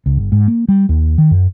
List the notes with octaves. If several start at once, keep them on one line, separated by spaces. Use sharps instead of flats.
C#2
G1
G#2
A#3
G3
D#2
D#3
F#2